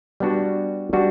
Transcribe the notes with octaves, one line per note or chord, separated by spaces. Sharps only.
G3 B3 D4 F#4
G3 B3 D4 F#4